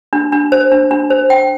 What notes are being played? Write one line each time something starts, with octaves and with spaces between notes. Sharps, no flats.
D4
D4
C5
D4
D4
C5
G5